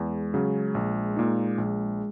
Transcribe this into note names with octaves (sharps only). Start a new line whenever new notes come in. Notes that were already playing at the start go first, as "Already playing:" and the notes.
Already playing: E2 G#3
C#3 F#3 C#4
A#1
A#2 A#3 D#4
A#1